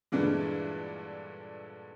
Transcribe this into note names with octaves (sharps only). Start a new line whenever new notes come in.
G2 A#2 D3 E3 G#3